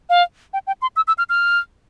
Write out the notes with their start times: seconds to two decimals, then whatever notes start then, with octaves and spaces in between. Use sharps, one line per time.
0.09 F5
0.53 G5
0.67 G5
0.82 C6
0.96 E6
1.08 E6
1.18 F6
1.29 F6